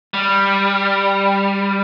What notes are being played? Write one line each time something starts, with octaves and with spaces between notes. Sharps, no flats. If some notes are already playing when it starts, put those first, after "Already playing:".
G3